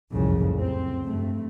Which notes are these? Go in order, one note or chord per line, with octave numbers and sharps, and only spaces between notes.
F#1 C2 F2 A2 C#3
C4
G2 A3